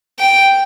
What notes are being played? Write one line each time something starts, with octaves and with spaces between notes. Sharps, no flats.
G5